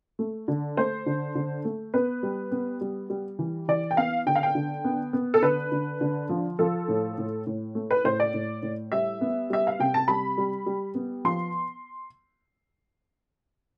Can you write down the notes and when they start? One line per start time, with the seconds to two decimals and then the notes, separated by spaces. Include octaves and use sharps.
0.19 A3
0.48 D3
0.77 A3 C5
1.06 D3
1.35 D3
1.65 A3
1.94 B3 B4
2.23 G3
2.52 B3
2.81 G3
3.10 G3
3.39 E3
3.68 E3 D5
3.91 G5
3.97 B3 F5
4.26 D3 G5
4.36 F5
4.43 G5
4.55 D3
4.85 B3
5.13 B3
5.34 A4
5.42 D3 B4
5.72 D3
6.01 D3
6.29 F3
6.59 F3 A4
6.88 A2
7.18 A2
7.47 A2
7.75 A3
7.91 B4
8.04 A2 C5
8.20 D5
8.34 A2
8.63 A2
8.92 G3 E5
9.21 B3
9.50 G3 E5
9.67 F5
9.80 C3 G5
9.94 A5
10.08 G3 B5
10.38 G3
10.66 G3
10.95 B3
11.25 F3 C6